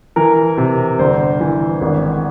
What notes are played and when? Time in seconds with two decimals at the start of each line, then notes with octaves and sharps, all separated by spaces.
0.16 E3 A#4
0.57 C3
0.99 G1 C5
1.41 E3
1.81 G#1